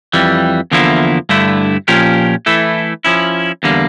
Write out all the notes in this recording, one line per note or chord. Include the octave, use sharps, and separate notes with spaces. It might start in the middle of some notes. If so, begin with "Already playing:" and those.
F2 E3 G3
E2 D3 F3 A#3 E4
G2 D3 A3 E4
A#2 F3 C#4 G4 A#4
E3 A3 E4 A4
F3 C#4 E4
E2 D3 G3 A#3